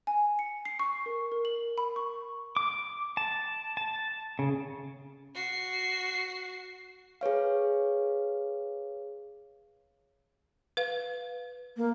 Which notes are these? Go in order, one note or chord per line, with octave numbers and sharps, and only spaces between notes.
G#5
C#7
C7
C#6
A#4
A#4
F#7
B5
C#6
D6
A5
A5
C#3
F#4 C7
G#4 B4 C#5 F5
B4 F5
A#3